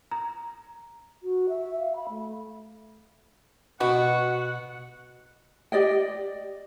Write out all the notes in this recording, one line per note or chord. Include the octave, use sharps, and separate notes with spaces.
A#5
F#4
E5
F5
B5
A3
B2 F#4 F#5
G4 D5 D#5 G5